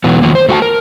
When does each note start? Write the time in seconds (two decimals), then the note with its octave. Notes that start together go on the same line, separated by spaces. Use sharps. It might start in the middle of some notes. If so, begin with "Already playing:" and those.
0.04 B2 E3 F#3 B3
0.22 D#3 F3 F#3 A#3
0.35 C5
0.49 A3 F#4 G5 A5
0.62 A#4